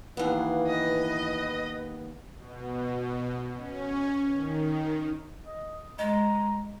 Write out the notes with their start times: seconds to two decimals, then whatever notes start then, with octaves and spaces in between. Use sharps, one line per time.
0.17 D#2 E3 B3 F5
0.67 B4 D#5
2.35 B2
3.54 C#4
4.33 D#3
5.46 D#5
5.99 G#3 D#5 A#5